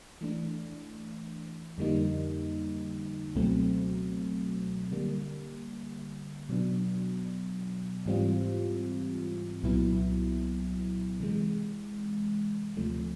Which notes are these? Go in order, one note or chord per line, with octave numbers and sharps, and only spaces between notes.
E3 A3 D4
F2 D3 G3 A#3 D#4
C#2 B2 F#3 A3 C4
D3 G3 A#3
B2 F#3 B3 D4
G#2 E3 G3 C4 F4
C2 A#2 F#3 B3 E4
C3 E3 G#3
D2 C3 F3 A3